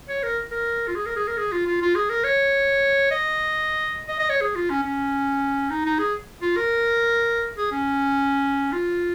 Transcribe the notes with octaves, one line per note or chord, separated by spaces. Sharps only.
C#5
A#4
A#4
F4
G#4
A#4
G#4
A#4
G#4
F4
F4
F4
G#4
A#4
C#5
D#5
D#5
D#5
C#5
G#4
F4
C#4
C#4
D#4
D#4
G#4
F4
A#4
G#4
C#4
F4